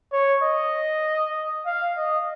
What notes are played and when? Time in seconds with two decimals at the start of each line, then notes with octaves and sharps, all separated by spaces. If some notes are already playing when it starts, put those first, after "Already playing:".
0.12 C#5
0.43 D#5
1.66 F5
1.97 D#5